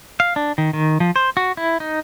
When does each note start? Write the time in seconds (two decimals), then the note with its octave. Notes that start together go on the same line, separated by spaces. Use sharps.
0.20 F5
0.36 D4
0.58 D#3
0.73 D#3
1.00 F3
1.16 C5
1.37 F#4
1.57 E4
1.80 D#4